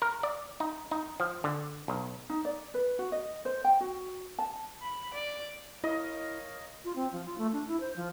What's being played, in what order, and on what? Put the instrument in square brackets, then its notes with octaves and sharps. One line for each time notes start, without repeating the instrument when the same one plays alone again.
[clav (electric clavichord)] A#4
D5
D#4
D#4
F3
D3
B1
[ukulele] D#4
D5
B4
F#4
D#5
C5
G5
F#4
A5
[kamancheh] B5
D5
[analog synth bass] E4 [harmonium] A#4 C#5 F5 [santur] D#5
[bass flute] F4
C4
F3
F4
A3
D4
E4
C5
F3